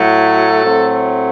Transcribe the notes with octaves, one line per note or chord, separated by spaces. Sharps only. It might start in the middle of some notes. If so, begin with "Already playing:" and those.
Already playing: A2 F#3 A3 A4
A2 F#3 A3 C4